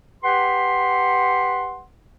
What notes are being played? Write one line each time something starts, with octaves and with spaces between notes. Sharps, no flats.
G4 B4 F#5 C6